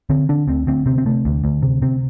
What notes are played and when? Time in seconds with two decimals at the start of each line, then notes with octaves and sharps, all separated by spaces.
0.10 D3 C4
0.29 D3 D4
0.48 D2 C4
0.67 D2 C4
0.86 C3 C4
0.98 C4
1.06 C3 A3
1.25 D2
1.44 D2
1.62 C3
1.82 C3 C4